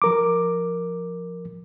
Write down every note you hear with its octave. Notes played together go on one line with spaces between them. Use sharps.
F3 A#4 D6